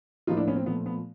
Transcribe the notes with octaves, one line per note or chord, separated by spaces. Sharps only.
A2 F3 A#3 D#4 F4
D4 E4
B3 C#4
C4
A#2 F3 A3 B3
B3